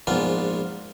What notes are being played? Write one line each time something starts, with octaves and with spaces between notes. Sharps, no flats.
A#1 G#2 B3 F4